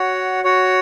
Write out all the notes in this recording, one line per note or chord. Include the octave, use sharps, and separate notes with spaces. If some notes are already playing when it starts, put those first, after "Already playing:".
Already playing: F#4 C#5 F#5
F#4 C#5 F#5